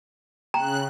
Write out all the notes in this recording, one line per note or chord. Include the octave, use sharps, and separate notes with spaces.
C#3 G5 A#5 F#6